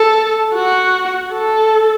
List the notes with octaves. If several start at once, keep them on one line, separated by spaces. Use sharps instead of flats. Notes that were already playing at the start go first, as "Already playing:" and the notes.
Already playing: A4
F#4
A4